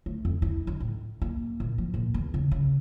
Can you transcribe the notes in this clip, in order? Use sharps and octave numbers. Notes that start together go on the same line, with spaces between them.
A3
F2
E4
D#4
A2
A#3
A#2
F3
A#2
E2
C#3
C#3